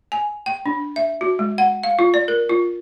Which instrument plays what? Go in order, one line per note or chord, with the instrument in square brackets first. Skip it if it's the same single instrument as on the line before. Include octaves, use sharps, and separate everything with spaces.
[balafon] G#5
G5
D4
E5
F#4
G#3
F#5
F5
F4
D5
A#4
F4